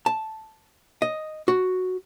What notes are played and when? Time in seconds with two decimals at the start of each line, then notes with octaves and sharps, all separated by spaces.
0.06 A5
1.02 D#5
1.48 F#4